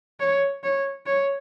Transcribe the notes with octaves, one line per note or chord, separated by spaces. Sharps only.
C#5
C#5
C#5